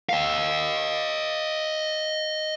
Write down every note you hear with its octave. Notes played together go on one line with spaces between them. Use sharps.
D#5 F5